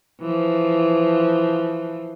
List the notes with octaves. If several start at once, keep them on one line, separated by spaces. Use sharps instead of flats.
E3 F3